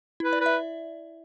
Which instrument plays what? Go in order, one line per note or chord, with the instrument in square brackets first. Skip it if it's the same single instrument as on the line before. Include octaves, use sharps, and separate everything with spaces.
[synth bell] E4
[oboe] B4
[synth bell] D5
[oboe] B4
[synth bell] E5